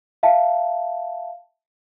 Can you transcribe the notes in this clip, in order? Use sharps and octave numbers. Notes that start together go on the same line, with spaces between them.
E5 F5 A5